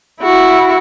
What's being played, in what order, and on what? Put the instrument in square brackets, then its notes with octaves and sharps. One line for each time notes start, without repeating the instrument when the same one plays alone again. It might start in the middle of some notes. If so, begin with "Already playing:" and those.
[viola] E4 F#4